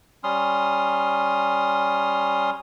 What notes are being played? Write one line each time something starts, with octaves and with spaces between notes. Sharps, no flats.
G3 C#4 C6 D#6 F6